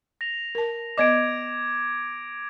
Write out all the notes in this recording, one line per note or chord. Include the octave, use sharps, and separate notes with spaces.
A#6 F7
A#4 A5
B3 D5 D#5 D6 G#6 D7